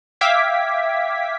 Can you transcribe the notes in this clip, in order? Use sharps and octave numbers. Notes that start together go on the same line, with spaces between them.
E5 F5 G5 D6 G#6 B6